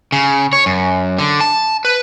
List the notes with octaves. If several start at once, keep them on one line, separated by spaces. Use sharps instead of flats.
C#3
C#5
F#2
D3
A5
B4